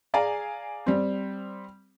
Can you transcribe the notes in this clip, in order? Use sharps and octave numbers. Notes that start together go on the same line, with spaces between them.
G#4 D5 F5 G#5 A#5
G3 C4